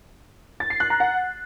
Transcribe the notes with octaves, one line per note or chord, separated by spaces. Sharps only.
A6
C7
F#6
A#5
F#5